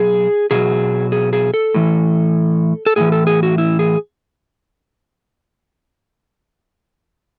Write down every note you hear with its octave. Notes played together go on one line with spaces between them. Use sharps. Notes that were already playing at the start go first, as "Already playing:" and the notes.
Already playing: B2 F#3 G#4
B2 F#3 G#4
G#4
G#4
A4
A2 E3
A4
A2 E3 G#4
A4
G#4
F#4
E4
G#4